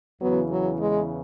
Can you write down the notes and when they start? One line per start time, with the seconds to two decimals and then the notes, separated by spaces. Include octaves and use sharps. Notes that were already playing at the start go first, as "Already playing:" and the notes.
0.21 E2 C#3 E3 F#3 B3
0.50 F#3
0.79 G#3